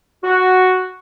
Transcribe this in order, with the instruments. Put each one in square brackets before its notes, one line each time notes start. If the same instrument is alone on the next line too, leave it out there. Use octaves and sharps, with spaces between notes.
[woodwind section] F#4